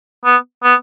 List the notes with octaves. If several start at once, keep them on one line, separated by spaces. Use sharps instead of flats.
B3
B3